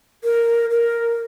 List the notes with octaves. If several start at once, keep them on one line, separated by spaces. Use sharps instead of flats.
A#4
A#4